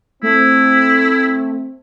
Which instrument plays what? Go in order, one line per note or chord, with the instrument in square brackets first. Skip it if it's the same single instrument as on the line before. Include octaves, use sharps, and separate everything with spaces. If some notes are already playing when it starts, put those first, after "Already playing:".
[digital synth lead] A3 [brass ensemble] C4 [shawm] E4